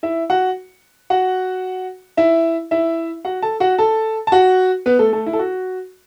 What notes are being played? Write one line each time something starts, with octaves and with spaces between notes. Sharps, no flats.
E4 E5
F#4 F#5
F#4 F#5
E4 E5
E4 E5
F#4 F#5
A4 A5
F#4 F#5
A4 A5
A5
F#4 F#5
B3 B4
A3 A4
A3 A4
E4
A4
F#4